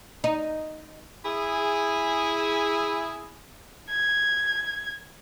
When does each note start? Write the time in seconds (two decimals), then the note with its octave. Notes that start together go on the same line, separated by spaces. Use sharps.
0.24 D#4
1.25 E4 G#4
3.90 G#6